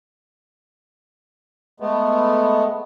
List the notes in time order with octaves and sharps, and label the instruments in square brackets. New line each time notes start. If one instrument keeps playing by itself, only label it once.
[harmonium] G#3 A3 B3